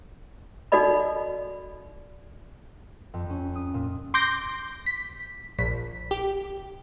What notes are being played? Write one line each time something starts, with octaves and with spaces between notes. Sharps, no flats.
D#4 F#4 A4 D5 D#5 B5
F2
C#4
D#6
A#2
C6 D6 G6 A#6
B6
A#1 B6
G4